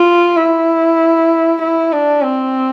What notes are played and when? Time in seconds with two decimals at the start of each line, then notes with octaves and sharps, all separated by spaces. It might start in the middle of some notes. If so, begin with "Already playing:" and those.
Already playing: F4
0.36 E4
1.61 E4
1.92 D4
2.23 C4